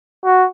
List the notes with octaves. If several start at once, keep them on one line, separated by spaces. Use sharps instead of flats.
F#4